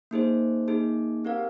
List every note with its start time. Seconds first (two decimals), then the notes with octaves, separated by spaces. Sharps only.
0.11 A#3 D#4 G#4 C5
0.68 A#3 D#4 G#4
1.25 C4 G4 A#4 F5